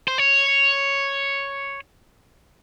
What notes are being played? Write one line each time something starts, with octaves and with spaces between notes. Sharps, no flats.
C5
C#5